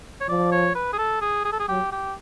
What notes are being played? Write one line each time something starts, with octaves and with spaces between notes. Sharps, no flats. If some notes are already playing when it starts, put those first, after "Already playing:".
C#5
F3 D5
C#5
B4
G#4
A4
G#4
G#4
A4
G#4
F#3 G4
G4